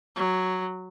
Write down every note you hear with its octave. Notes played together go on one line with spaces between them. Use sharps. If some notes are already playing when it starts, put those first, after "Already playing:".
F#3